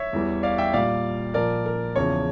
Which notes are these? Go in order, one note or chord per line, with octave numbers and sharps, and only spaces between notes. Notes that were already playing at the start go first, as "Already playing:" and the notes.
Already playing: C#5 E5
E2 E3 G3
D5 F5
E5 G5
A#2 G3 D5 F5
A#2 F3 A#4 D5
A#4
E2 C#3 F3 C#5